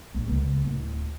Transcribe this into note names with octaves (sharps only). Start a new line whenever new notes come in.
A#1
C#2
D1